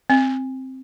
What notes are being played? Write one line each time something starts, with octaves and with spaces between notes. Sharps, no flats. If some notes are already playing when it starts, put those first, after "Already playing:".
C4